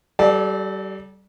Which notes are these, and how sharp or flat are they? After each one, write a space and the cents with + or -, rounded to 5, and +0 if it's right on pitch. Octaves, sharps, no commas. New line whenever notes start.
G3 -30 A4 -30 D5 +20